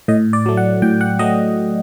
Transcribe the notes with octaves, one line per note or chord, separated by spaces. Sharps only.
A2 D#5
D5
F#3 A3
F#5
A2 G5
F#5
F#3 A3 D#5